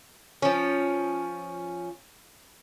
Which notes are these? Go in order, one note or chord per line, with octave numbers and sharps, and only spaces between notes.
F3 C#4